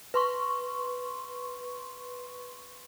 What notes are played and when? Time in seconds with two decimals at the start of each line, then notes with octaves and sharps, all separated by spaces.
0.14 B4 C6 C#6